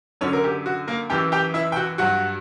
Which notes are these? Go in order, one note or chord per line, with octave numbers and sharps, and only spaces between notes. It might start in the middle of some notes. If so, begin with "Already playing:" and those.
F#2 D3 F#3 C#4 C#5
A#4
G4
F#4
A#3 A#4
F#2 E3 G4 G5
G4 G5
E4 E5
G5
F#4 F#5
G2 F#3 F#4 F#5